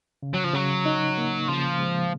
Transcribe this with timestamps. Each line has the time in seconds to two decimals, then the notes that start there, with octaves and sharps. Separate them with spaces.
0.23 C#3
0.34 F#3
0.44 F3
0.54 C#3 F#3
0.86 D#4
1.18 A#3
1.48 C#3 F3
1.80 G#3